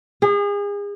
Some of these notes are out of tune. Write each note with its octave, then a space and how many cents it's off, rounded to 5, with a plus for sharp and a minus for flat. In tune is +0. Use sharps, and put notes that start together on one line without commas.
G#4 -35